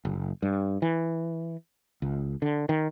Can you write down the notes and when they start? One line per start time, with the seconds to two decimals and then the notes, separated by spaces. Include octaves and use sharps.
0.05 F#1
0.42 G2
0.82 E3
2.02 C#2
2.42 D3
2.69 D#3